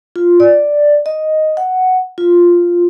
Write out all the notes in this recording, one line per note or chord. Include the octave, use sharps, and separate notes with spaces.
F4
D5
D#5
F#5
F4